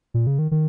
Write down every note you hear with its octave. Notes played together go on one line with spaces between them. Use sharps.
A#2
C#3
D#3
D#3